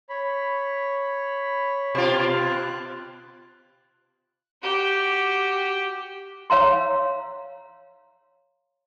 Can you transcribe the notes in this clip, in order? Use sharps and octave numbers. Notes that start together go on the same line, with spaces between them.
C#5 B5
B2 F4
F#6
F#4 G4
C#5 F5 A#5 C6